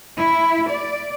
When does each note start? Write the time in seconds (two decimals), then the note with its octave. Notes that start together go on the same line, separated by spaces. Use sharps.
0.18 E4
0.71 D5